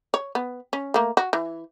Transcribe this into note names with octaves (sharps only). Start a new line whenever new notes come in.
C#5
B3
C#4
A3 A#3
F#4
E3